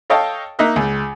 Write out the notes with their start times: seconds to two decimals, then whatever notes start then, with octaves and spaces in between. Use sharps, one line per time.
0.10 A4 C#5 D#5 F5 G5 A5
0.59 A#3 D#4 D#5 E5 F#6
0.76 C#2